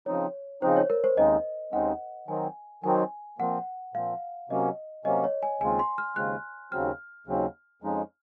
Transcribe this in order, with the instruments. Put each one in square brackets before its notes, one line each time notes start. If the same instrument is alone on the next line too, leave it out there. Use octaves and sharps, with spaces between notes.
[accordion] C#3 F3 C4 D#4 [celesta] C#5
[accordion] C#3 F3 C4 D#4 [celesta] C5
[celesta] C#5
A#4
C5
[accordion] D#2 C#3 G#3 C4 D#4 [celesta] D#5
[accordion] D#2 C#3 G#3 C4 D#4 [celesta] F#5
[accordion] D#3 F#3 C4 [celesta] G#5
[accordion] D#3 F#3 C4 [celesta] G#5
[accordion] A#2 F3 C4 [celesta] F#5
[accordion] A#2 F3 C4 [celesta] F5
[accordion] C3 F#3 A#3 C#4 [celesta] D#5
[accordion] C3 F#3 A#3 C#4 [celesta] D#5
[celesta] C#5
G#5
[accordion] D#2 C#3 G#3 C4 F4 [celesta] G#5
[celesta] C6
F6
[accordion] D#2 C#3 G#3 C4 F4 [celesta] F#6
[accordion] D#2 C#3 F#3 C4 [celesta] F6
[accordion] D#2 C#3 F#3 C4
F2 C#3 F3 G#3 D#4